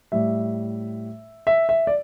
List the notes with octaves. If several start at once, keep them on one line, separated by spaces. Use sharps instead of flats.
A2 G3 E5
E5
E5
D5